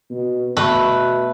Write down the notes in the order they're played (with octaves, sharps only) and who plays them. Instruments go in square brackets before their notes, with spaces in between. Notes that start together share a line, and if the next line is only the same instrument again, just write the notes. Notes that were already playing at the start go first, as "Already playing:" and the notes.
[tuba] B2
[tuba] B2 [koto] A3 B4